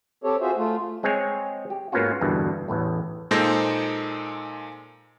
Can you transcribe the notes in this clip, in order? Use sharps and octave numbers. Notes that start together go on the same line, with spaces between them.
C4 G4 A4 C#5
F4 F#4 G#4 C5 E5
A3 F4
G#3 C4 G#4 C#5 G#5
G4
G#2 A#3 B3 C#4 F4 F#4
E2 G2 B2 D3
A1 E2 A2
A#2 G#3 D#4 A4 C5 A#6